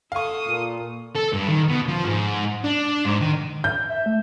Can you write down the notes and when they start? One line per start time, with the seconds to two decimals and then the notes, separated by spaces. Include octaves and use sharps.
0.12 A4 F5 C#6 D#6
0.47 A#2
1.16 A4
1.33 G2
1.49 D#3
1.69 B2
1.88 F3
2.05 G#2
2.64 D4
3.05 G#2
3.21 D#3
3.64 G6
3.89 E5
4.06 A3